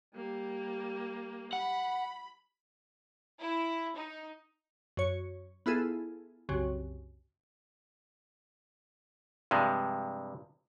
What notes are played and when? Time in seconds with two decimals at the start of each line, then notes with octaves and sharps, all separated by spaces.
0.15 G3 A#3
1.53 F#5 B5
3.40 E4
3.96 D#4
4.97 F#2 C#5 C#7
5.66 B3 E4 F4 G#4 A4
6.49 C2 F#2 C#3
9.51 G2 C3 F3 G#3